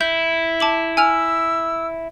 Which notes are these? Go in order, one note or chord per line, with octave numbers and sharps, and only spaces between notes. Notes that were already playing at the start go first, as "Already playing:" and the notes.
E4 G6
A5 D6 F#7
G#5 E6 F6 F7